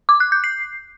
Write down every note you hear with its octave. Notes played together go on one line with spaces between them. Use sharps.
D6
F#6
G6
C7